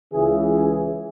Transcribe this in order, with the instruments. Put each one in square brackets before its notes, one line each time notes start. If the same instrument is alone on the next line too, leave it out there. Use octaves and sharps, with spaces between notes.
[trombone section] C#2 C#3 E3 G#4
G#4